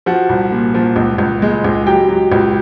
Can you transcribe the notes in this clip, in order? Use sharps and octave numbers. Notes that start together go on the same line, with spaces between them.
F3 F#4 F#5
C2
A#2
F3
C#2
C#2
G#3
C#2
F#3 G4 G5
F#3
C#2